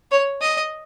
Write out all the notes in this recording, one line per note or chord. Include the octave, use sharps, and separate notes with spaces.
C#5
D#5